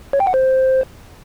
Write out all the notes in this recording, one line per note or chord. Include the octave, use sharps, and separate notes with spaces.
C#5
G5
F#5
C5